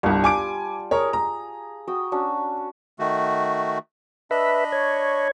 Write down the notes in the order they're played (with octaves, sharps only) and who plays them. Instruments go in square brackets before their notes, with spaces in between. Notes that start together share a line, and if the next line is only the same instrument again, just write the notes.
[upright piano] G1 C2 [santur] G3 F4 A5
[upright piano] G#5 D6 D7
[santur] G#4 [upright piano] A#4 C#5
[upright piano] A#5
[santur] F#4 G5 D#6
C#4 D4 F#4
[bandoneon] D#3 A3 F#4
[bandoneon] D4 D#5 B5 [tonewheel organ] B4 E5
[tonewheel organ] C#5